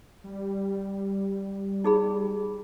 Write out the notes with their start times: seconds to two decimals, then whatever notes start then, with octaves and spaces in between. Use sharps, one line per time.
0.24 G3
1.84 D#4 G#4 B5